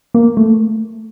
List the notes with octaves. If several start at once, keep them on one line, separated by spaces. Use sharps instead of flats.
A#3
A3